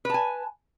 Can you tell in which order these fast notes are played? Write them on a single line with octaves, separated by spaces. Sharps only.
B4 A5 G#5